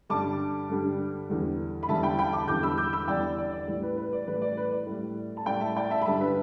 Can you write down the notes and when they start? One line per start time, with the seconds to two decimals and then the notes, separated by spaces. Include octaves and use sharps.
0.09 G2 D3 G3 A5 D6
0.69 G2 D3 G3
1.29 E2 D3 G3
1.83 B5
1.89 E2 D3 G3 E5 A5
2.03 G5 B5
2.19 G5 B5
2.33 A5 D6
2.48 E2 D3 G3 D6 G6
2.63 B5 E6
2.78 D6 G6
2.93 B5 E6
3.08 E2 D3 G3 D5 G5
3.38 D5
3.52 D5
3.67 A2 E3 G3
3.83 B4
3.97 B4
4.12 D5
4.27 A2 E3 G3 B4
4.42 D5
4.57 B4
4.72 D5
4.86 A2 G3
5.37 A5
5.46 A2 G3 D5 G5
5.61 E5 A5
5.76 D5 G5
5.90 E5 A5
6.02 B5
6.06 G2 D3 G3 E5 A5
6.20 B4 E5